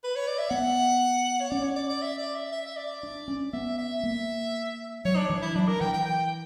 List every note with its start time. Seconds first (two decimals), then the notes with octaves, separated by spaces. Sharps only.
0.04 B4
0.16 C#5
0.28 D5
0.39 E5
0.50 B3 F#5
1.41 C#5
1.50 C#4 D5
1.64 C#5
1.76 D5
1.89 D5
2.02 E5
2.18 D5
2.35 E5
2.52 E5
2.67 E5
2.77 D5
3.03 D4
3.28 C#4
3.53 B3 E5
3.78 E5
4.03 A#3
5.05 F#3 C#5
5.17 D4
5.30 E3
5.42 E4
5.55 F#3 D4
5.68 A#4
5.81 E3 G5
5.94 G5
6.06 G5